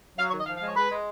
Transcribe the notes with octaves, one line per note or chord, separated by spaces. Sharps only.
F#3 F5
C#5
D#3
D#5
F3 F5
F5
G#3 C#5
G#3 B4
G#3